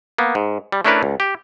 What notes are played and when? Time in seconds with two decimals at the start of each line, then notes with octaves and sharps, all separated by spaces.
0.18 A#3 B3
0.35 G#2
0.72 G3
0.85 A3 C#4 D4 E4 A#4 B4
1.03 C#2
1.20 G4